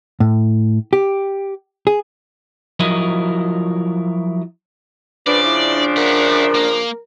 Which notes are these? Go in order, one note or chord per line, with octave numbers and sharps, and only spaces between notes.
A2
G4
G#4
F3 F#3 E4 A#4 D#5
C#3 F3 D4 B4 D5
E4
A#4 E5 F#5
A#3